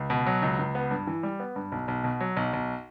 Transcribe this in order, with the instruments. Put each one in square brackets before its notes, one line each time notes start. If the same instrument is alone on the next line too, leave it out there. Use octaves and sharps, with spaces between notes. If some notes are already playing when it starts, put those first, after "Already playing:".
Already playing: [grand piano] C#2
B2
F#3
C#2
C#2
B3
G2
E3
G3
B3
G2
B1
B1
B2
F#3
B1
B1